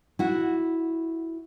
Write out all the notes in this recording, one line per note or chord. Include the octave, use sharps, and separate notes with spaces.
E4 F#4